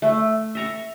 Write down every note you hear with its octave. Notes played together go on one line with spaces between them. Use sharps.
A3
E5 A#5 C#6